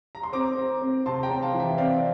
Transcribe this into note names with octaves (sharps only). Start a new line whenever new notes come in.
A#5
C6
C4 A#5 D6
C4
C4
C3 A5 C6
G5 A#5
C4
F5 A5
E3
E5 G5
C4 D5 F5